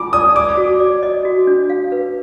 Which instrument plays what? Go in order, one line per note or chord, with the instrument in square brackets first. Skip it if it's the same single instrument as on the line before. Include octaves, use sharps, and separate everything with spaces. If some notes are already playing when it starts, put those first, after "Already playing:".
Already playing: [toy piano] F4 [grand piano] D6
[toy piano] D5 [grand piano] D#6
[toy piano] D5 [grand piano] D6
[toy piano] F#4
D5
D#5
F#4
D4
F5
B4